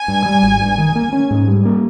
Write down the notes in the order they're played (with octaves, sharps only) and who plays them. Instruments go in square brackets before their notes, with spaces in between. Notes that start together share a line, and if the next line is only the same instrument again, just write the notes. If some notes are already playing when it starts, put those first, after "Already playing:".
Already playing: [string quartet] G#5
[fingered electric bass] G2
G3
G#1
G2
D#3
A#3
C#4
G#2
G3
A#3